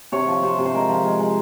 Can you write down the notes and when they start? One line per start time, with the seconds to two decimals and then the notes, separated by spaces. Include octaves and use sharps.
0.12 C3 C#5
0.28 F3
0.43 C3 C5
0.58 C3
0.66 C5
0.74 G#3 A#4
0.89 F3
1.05 G#3
1.20 G#3